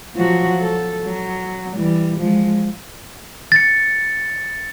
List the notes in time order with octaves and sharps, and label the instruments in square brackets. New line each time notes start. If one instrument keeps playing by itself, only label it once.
[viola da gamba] F3 F#3 F#4
A4
F#3
E3 G3
F3 G#3
[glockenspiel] A6 C#7